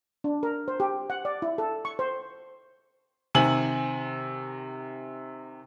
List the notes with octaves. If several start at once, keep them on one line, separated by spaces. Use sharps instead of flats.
D4
A#4
C5
G4
F#5
D5
E4
A4
C#6
C5
C3 D#3 G#5 F#7